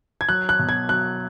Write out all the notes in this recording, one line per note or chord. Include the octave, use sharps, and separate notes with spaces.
G#6
F#3 F#6
F#6
B2
G#6
F#3 F#6